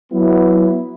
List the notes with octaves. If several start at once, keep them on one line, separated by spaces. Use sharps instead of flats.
F#3 B3 E4